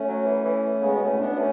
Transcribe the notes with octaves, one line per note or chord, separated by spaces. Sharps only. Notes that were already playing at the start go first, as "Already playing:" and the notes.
Already playing: A3 C#4
F#3
E3
E3
C#3 G#3 B3
B2 A3 C#4
A2
B2 B3 D4
B2 A3 C#4